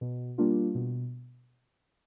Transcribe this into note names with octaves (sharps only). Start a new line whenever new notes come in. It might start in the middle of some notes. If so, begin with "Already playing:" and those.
B2
G3 A#3 D4 F4
B2